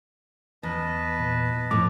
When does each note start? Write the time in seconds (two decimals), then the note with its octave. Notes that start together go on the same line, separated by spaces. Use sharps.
0.63 E2 B4 D#5 A5
1.20 A#2
1.71 F2 A2 D6